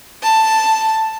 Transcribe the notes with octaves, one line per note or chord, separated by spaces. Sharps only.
A5